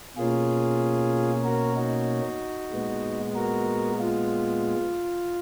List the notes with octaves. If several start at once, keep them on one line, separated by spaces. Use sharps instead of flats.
B2 A#3 C#4 F4 G#4
F#4 A#4
D#4 F#4
A#2 G#3 B3
F#4 A#4
F4